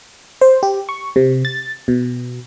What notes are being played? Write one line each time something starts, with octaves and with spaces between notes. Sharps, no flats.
C5
G4
C#6
C3
A6
B2